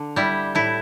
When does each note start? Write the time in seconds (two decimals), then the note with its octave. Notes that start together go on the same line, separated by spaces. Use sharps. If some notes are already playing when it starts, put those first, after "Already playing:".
Already playing: D3
0.16 G3 E4
0.55 A2 E4